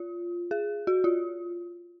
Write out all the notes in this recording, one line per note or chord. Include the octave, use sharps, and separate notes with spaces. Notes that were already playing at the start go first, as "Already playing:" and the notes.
Already playing: F4
G#4
F#4
F4